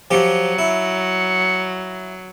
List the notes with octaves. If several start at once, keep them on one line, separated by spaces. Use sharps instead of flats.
F3 F#3 G4
E4